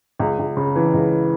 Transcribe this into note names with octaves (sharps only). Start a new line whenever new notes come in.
C#2
C#2
C#3
E3
C#2